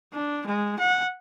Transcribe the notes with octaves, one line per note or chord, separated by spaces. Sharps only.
D4
G#3
F#5